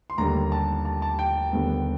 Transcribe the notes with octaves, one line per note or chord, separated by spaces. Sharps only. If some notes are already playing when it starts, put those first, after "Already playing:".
C6
D#2 D3 G3 A#3 A#5
A5
A5
A5
G5
D#2 D3 G3 B3